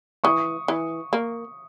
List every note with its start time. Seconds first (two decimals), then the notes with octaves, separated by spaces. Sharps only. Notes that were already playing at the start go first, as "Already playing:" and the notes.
0.24 E3 C#6 D#6
0.68 E3
1.13 A#3